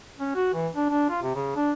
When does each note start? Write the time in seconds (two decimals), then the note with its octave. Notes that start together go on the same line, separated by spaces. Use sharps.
0.19 C#4
0.35 F#4
0.54 E3
0.75 D4
0.89 D4
1.09 F4
1.22 C3
1.35 C#3
1.56 D4